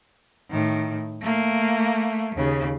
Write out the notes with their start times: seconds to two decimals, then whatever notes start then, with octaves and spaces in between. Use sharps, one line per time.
0.50 A2 D#3
1.21 A3 A#3
2.35 D#2 C#3